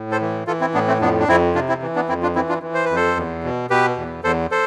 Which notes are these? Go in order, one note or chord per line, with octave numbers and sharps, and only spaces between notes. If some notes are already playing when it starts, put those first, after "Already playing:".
Already playing: A2
A4 C5
E3
E3 F4 A4
C4 E4
A2 B3 D4
A3 C4
F2 B3 D4
D4
F2 C4 E4
C3 D4 F4
C4 E4
E3
B3 D4
F2 C4 E4
D4 F4
E3 C4 E4
D4 F4
E3
C5
B4
F2
A4 C5
E2
B2
B2 G4 B4
E2
E2 A4 C5
A4 C5